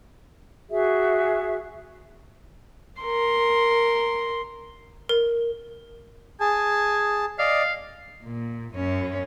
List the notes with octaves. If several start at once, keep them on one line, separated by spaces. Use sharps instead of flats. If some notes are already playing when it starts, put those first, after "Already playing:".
F#4 G#4 E5
A#4 C6
A#4
G#4 G#5 A5
D5 D#5 F5
A#2
F#2 C#4